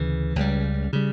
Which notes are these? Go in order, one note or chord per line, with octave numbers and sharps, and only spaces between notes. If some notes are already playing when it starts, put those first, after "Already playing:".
Already playing: D2 C#3 E3
C#2 C#3 G3
C#3 G3